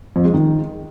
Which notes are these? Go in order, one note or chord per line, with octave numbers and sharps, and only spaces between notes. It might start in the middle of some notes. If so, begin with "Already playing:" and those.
F2
G#3
D#3